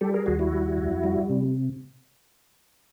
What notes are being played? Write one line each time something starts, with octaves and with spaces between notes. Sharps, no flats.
G3 G4 A4
G#4 A#4
D#2 F#4 G#4
E4 F#4
G3
F2
G3
C3